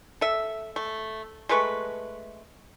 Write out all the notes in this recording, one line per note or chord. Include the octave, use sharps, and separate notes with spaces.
A4 E5
A3
G#3 A3 B4 C#6